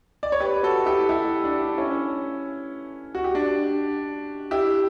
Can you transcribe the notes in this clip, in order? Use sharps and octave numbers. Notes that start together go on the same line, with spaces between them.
D5
C#5
G4 B4
F#4 A4
E4 G4
E4 G4
D4
D4
C#4 E4
F#4
G4
D4 F#4
E4 G4